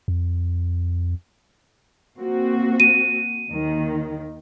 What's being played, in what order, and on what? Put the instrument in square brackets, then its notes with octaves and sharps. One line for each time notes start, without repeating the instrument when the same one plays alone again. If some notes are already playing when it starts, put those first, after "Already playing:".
[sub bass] F2
[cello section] A#3 C4 F#4
[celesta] D#7
[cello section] D#2 D#3